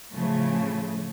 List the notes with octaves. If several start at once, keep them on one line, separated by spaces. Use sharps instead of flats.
A2 C#3 F3 A3